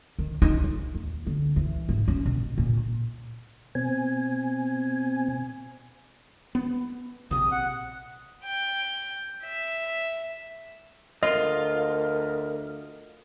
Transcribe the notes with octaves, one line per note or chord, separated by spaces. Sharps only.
D#3
D#4
F4
D#2
D3
E3
G#2
C#4
B2
A#2
B2 C4 G#5
B3
A#1 C3 D#6
F#5
G5
E5
D2 F4 A#4 D#5